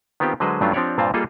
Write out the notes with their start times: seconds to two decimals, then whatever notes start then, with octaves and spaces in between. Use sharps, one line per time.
0.20 D#3 B3 C4 F4 G4
0.40 D3 F#3 G#3 B4 C5 D#5
0.61 G2 F#3 A3 C#4 D4 F4
0.73 F3 C4 D4 G4 C#5 D5
0.98 G2 A#2 C4 F4 A5
1.14 G3 A#3 F4 G#4 A4 D#5